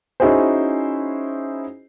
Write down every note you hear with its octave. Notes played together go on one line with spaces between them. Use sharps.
C#4 D#4 E4 F#4 G#4 C5